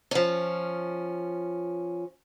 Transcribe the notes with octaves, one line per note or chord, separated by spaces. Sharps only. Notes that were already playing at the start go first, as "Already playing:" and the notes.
F3 C#4